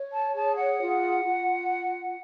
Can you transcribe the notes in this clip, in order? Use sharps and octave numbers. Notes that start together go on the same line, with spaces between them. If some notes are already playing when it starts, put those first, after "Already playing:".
Already playing: C#5
A5
G#4 A5
F#5
F4
F4